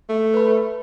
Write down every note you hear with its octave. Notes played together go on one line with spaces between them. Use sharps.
A3
B4 B5